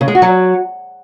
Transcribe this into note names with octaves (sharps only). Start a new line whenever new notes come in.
C#3
G#3
F#4
F#3